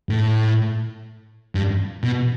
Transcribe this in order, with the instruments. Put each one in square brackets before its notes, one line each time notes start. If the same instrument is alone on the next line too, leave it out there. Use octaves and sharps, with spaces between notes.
[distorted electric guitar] A2
G2
B2